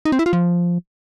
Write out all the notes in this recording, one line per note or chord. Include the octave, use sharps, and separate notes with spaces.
D#4
C4
E4
F4
F3